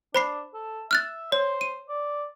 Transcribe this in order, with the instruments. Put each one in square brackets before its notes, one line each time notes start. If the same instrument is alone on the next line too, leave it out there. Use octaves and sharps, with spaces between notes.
[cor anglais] D4 [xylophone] C5 B5 C7
[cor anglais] A4
[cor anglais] E5 [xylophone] F6 F#6 A6
[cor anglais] C5 [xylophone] C#5
[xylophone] D#7
[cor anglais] D5